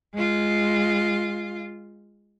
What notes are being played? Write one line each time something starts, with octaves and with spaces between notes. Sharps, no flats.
G#3 F4